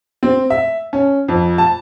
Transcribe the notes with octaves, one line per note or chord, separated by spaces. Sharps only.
C4
E5
C#4
F2
A5